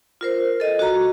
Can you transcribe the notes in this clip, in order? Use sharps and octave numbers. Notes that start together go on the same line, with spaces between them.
F4 A#4 C5
A4 D#5
F#4 A#5